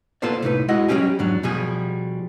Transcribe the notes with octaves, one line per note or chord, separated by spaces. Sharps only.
A#3 B3 F4 A4 C5 D5
C2 A2 D#4 B4
G#3 E4 F#4 D#5 F#5
F#3 G3 A3 C#4 G4 G#4
E2 G#2 F#3 D4
B2 F3 G3 G#4